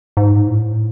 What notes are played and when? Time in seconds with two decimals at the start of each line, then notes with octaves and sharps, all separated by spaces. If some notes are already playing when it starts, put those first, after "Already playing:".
0.17 G#2
0.47 A2